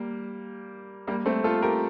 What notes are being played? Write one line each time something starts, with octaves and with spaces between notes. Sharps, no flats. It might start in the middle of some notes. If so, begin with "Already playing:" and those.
Already playing: G3 A#3
G3 A#3
A3 C4
F4 A4
G4 A#4